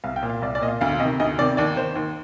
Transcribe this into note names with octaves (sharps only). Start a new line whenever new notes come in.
C2 F5
G5
A#2
F5
C2 D5
D5
A#2 D#5
F5
D2 F5
C3 D#3 D#5
D2 D#5
C3 D#3 D5
D#2 D5
D#3 C5
D#2